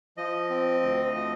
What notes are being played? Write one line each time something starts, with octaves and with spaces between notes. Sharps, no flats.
F3 D#5
C4
D2
F3